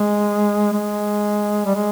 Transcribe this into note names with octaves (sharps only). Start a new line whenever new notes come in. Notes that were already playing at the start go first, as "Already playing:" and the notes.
Already playing: G#3
G#3
G3
G#3